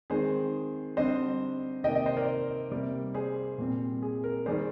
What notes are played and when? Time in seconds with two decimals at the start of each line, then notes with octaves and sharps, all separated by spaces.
0.10 D#3 G#3 C4 G#4 C5
0.97 D3 G3 C4 C5 D#5
1.84 C3 D#3 A#3 D#5 G5
1.95 D#5 G5
2.06 C5 D#5
2.17 A#4 D5
2.71 C3 G3 A#3
3.14 G#4 C5
3.58 A#2 G3 C4
4.02 G#4
4.24 A#4
4.46 D#3 G3 A#3 G#4 C5